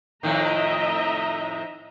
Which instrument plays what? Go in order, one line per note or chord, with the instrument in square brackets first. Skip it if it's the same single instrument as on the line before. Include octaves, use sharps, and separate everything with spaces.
[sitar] F2 A2 D#3 [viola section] D#5 E5 A#5